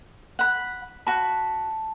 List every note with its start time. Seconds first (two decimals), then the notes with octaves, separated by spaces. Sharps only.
0.39 F#5 B5
1.07 F#4 A5 B5